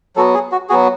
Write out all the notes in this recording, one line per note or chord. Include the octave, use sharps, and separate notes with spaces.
F#3 B3 F#4 A4
G#4
F#4
F#3 B3 F#4 G#4